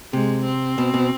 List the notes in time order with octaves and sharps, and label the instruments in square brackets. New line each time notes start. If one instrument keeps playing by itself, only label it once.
[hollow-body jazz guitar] C3 [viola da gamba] G#3
[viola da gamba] C4
[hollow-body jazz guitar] B2
B2